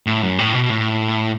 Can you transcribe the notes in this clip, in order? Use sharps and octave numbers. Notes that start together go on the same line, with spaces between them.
A2
F#2
A2
B2
A2